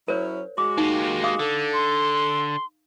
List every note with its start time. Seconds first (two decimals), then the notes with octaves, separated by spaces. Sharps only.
0.08 F#3 C#4 E4 A#4 C5 C#5
0.58 G#3 F#4 D6
0.78 A#3 D#4 G4
1.24 F5 D6 D#6
1.39 D3 A4
1.73 C6